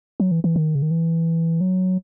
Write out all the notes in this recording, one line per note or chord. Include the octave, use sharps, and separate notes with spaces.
F#3
E3
E3
D#3
C#3
D#3
E3
F#3